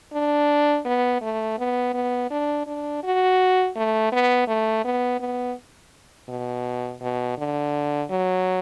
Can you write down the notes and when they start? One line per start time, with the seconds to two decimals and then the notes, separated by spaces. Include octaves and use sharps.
0.13 D4
0.86 B3
1.22 A3
1.58 B3
1.94 B3
2.31 D4
2.67 D4
3.04 F#4
3.76 A3
4.12 B3
4.48 A3
4.85 B3
5.20 B3
6.29 B2
7.01 B2
7.38 D3
8.10 F#3